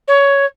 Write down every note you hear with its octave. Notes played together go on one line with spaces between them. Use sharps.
C#5